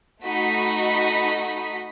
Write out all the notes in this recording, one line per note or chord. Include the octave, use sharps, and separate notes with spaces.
A3 D#4 F#4 D#5 B5 B6